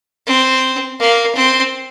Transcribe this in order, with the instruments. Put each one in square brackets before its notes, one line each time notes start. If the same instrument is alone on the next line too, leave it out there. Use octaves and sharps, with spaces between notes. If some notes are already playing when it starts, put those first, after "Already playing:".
[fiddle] C4
A#3
C4